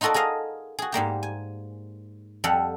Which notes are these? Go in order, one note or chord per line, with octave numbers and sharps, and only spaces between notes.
D#4 F4 F#4 A4 A#4 D5
G#4 A#4 D#5 F5
F#4 G#4
G#2 G3 A#3 G4
G#5
F2 G3 A4 F5 F#5